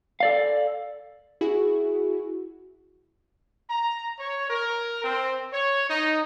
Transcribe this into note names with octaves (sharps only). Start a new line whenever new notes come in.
A4 D5 F5
E4 F#4 G#4
A#5
C#5
A#4
C4
C#5
D#4